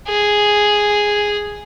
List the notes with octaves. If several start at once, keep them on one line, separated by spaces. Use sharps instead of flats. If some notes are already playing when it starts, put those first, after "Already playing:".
G#4